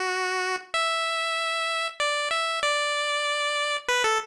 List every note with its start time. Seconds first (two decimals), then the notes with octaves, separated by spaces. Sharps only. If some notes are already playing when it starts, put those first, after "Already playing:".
Already playing: F#4
0.74 E5
2.00 D5
2.31 E5
2.63 D5
3.88 B4
4.04 A4